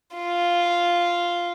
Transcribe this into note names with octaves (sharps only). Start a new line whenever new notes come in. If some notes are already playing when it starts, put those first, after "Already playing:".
F4